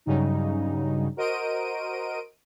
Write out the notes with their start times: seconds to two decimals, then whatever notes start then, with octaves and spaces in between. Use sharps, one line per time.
0.06 G2 C#3 F#3 G3 D#4
1.17 F#4 A#4 C5 D#5 D7 D#7